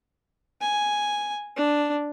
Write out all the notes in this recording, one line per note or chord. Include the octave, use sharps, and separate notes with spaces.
G#5
D4